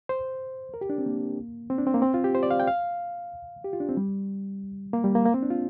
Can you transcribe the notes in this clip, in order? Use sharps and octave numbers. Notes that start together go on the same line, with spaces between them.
C5
A#4
G4
D4
C4
A#3
C4
D4
C4
A#3
C4
F4
G4
C5
D5
F5
G5
F5
G4
F4
D4
C4
G3
A#3
G3
A#3
A#3
C4
D4
F4